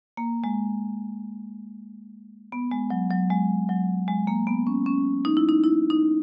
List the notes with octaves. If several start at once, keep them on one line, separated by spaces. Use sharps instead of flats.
A#3
G#3
B3
G#3
F#3
F#3
G#3
F#3
G#3
A#3
B3
C#4
C#4
D#4
E4
D#4
E4
D#4